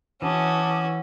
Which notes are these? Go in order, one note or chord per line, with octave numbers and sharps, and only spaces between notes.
E3 C#4 F#4 A5 D6 D#6